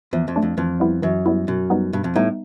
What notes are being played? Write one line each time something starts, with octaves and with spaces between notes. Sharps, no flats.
E2 F3
F2
A3 D4
F2
F2 E3
G3 B3 E4
F#2 E3
G3 B3 E4
F#2 B2
G3 B3 D#4
G2 B2
F2
A2 G3 B3 D#4